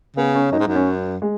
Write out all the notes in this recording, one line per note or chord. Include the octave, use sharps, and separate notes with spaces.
C#3 B3
C#4
F#2 D#4
G#2
F#2 D#4
C#4
G#3